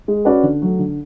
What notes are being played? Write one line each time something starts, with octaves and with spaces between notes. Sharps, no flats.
G#3
C#4 F#4 B4 D5
D3
F#3 A3
D3